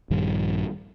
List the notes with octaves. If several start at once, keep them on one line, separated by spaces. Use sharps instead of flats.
A#1 G2 D#3 G3